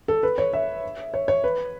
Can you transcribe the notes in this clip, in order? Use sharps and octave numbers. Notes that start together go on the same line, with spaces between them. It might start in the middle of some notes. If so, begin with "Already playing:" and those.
A4
B4
C#5
E5
C#5
C#5
B4